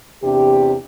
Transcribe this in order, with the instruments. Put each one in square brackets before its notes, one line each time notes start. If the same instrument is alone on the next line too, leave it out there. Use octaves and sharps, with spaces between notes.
[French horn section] E2 C3 D4 G4